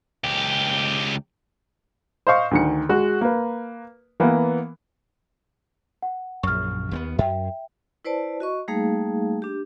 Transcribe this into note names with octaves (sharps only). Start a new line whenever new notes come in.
C#2 G4
C5 D#5 F5 C#6
D2 D#3 C#7
G#3 F#4
A#3 B4
E3 A#3 B3
F#5
A#1 F#2 C#6 F6
D#2 A3 B3
F#2 E5 G5
E4 B4 C5 D5 A5
F#4 D#5 C#6
G3 A3 A#3 D#4 G#4 F5
D4 G4